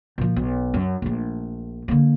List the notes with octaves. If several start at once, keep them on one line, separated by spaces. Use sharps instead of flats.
A#2 F3
B1
F#2
A#1 A3
D3 A#3